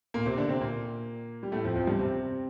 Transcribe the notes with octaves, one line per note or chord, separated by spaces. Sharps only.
A#2 A#3
C3 C4
D3 D4
C3 C4
A#2 A#3
G3
A2 A3
F2 F3
F2 F3
G2 G3
C3 C4